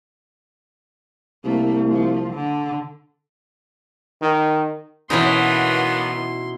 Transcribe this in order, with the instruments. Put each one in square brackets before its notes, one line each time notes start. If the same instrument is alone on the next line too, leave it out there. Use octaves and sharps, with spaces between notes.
[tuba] C2 [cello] A3 A#3
[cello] F3
D3
[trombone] D#3
[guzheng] B2 C#4 D#4 [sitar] E3 [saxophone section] F#3 A#3 B3 [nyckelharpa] C6